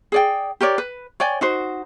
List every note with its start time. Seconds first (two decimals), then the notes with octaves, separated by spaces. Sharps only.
0.12 G#4 D5 G5
0.61 G4 A#4 C#5 D5
0.78 B4
1.20 C#5 D5 G5 G#5
1.41 D#4 F#4 C5